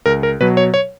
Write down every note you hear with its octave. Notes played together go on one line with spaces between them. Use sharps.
C#2 A#4
A#4
B2 F#3 B4
C#5
C#5